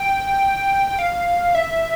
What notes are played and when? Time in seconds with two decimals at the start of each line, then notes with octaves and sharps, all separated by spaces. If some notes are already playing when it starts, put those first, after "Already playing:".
Already playing: G5
0.99 F5
1.55 E5